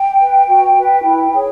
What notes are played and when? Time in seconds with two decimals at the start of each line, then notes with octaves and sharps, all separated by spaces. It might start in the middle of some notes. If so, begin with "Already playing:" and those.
Already playing: G5
0.19 B4
0.47 F#4
0.76 B4
1.05 E4
1.33 G#4 C#5